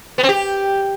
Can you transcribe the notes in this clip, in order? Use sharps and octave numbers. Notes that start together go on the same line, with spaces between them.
B3
C4
G4